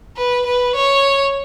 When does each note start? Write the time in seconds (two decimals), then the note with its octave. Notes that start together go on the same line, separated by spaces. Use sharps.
0.17 B4
0.46 B4
0.75 C#5